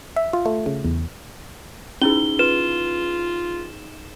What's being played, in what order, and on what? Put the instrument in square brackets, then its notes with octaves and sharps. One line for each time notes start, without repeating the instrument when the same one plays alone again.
[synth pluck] E5
F4
A3
C#3
E2
[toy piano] C#4 E4 [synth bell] D#4 G#4 [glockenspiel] G7
[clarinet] F4 [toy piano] B4 [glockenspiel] E7